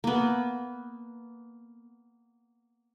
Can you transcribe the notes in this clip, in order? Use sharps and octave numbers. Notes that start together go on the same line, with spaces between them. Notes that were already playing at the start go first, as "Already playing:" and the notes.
A#3 B3